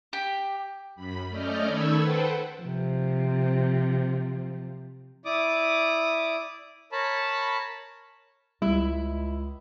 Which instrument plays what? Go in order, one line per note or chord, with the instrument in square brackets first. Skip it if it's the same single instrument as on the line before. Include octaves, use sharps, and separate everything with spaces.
[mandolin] G4
[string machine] F#2 B5
A3 C#4 D5 D#5 F6 G6
D#3 A4 B5 C#6 E6 G#6
A4 B4 C5 F#5 G5
[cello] C3 F3
[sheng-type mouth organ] E4 D5 D6 D#6
A#4 C#5 A5 B5
[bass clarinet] C#2 [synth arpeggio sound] G3 [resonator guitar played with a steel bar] E4